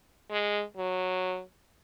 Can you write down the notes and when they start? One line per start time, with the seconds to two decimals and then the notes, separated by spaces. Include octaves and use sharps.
0.31 G#3
0.77 F#3